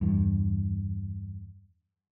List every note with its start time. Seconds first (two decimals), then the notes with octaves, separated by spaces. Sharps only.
0.01 E2 G2